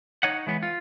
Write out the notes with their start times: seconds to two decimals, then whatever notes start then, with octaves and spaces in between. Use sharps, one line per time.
0.23 D#4 C#5 D#5 F#5
0.47 E3 G#3 B3
0.63 F4